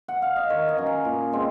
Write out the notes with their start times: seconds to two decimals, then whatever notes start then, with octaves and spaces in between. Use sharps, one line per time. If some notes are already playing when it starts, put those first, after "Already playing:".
0.08 F#5
0.22 F5
0.36 D#5
0.50 D#3 C#5
0.69 D#5
0.77 F#3 C#4
0.86 F5
1.05 A#2
1.33 G#3 C4